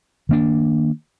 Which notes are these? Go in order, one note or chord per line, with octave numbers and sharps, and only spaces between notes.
D#3 A#3 D4